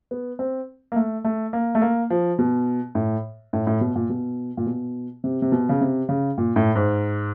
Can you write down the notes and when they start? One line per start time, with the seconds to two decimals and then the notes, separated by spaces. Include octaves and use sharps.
0.11 B3
0.39 C4
0.92 A#3
0.96 A3
1.24 A3
1.53 A#3
1.75 A3
1.82 A#3
2.10 F3
2.39 B2
2.95 A2
3.53 A2
3.67 A2
3.81 B2
3.96 A#2
4.09 B2
4.57 A#2
4.66 B2
5.24 C3
5.42 C3
5.52 B2
5.69 C#3
5.81 C3
6.09 C#3
6.38 A#2
6.56 A2
6.75 G#2